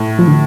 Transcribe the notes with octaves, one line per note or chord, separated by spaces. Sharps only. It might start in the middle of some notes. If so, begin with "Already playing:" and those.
Already playing: A2
F3
D3